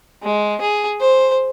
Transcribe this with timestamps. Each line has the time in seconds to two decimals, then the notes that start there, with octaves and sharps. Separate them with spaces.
0.23 G#3
0.61 G#4
1.00 C5